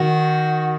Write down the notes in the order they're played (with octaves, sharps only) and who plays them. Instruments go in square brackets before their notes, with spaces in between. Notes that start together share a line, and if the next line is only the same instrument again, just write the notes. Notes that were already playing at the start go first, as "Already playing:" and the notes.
Already playing: [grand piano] D#3 [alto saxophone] F#4